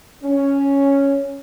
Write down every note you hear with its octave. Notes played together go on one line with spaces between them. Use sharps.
C#4